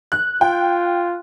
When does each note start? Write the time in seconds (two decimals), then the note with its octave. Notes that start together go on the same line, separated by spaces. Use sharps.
0.12 F#6
0.41 F4 G5